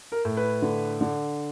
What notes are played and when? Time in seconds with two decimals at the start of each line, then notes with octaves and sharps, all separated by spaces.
0.12 A#4
0.25 A2
0.37 B4
0.62 D3
1.01 D3